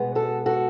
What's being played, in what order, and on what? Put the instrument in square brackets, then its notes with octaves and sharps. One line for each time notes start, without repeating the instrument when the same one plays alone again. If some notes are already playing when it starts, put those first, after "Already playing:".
Already playing: [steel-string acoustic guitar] B2 G#3 B3
F#4 A4
F#4 A4